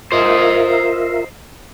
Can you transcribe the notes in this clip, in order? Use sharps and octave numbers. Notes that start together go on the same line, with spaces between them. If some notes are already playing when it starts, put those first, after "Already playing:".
F4 A#4 C5 D#5 E5